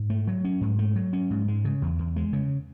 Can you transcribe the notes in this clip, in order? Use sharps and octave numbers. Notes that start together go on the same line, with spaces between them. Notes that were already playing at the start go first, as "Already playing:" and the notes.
Already playing: G#2
A3
F#3
C#4
G#2
A3
F#3
C#4
G#2
G#3
C#3
E2
E2
G#3
C#3